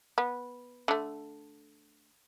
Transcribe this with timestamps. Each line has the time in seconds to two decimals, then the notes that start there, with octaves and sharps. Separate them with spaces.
0.18 B3
0.88 D3 A3